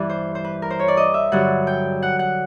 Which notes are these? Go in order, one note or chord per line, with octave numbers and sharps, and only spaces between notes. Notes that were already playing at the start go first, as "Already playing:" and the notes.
Already playing: G2 E3 G3 D5
C5
C5
B4
A#4
C5
C#5
D5
D#5
E5
G2 D3 F#3 F#5
G5
F#5
F#5